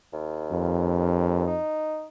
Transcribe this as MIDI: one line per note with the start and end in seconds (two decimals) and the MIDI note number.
0.13 1.45 39
0.52 1.59 41
1.47 2.06 63